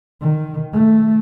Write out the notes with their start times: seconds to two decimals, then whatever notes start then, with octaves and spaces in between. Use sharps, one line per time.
0.21 D#3
0.73 A3